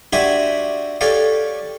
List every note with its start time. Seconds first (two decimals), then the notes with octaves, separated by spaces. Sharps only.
0.13 D4 F#4 G4 E5 G#5 C6
1.01 G4 A4 C#5 D5 F5